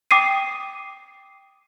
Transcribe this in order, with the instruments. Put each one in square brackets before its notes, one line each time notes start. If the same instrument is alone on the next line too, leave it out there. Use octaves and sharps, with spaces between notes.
[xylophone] G5 D6 D#6 C7 D#7